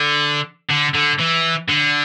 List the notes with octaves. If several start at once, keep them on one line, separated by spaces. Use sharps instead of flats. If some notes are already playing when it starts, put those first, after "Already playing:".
Already playing: D3
D3
D3
E3
D3